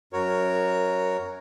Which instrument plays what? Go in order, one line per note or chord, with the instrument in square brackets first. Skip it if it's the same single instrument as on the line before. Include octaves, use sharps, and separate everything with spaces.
[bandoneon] F#2 F#4 A#4 C#5